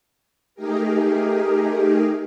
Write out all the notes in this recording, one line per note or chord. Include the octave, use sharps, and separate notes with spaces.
A3 D#4 G4 G#4 A#4